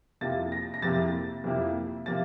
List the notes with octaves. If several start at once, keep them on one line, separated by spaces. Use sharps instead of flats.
F2 C3 F3 A#3 E4 A6
A#6
A#6
F2 C3 F3 A#3 E4 A6
F2 C3 F3 A#3 E4
C3 F3 A#3 E4 A6